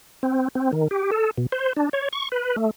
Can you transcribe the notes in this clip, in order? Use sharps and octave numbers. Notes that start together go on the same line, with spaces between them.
C4
C4
D#3
G4
A4
B2
C5
D4
C#5
C#6
B4
A3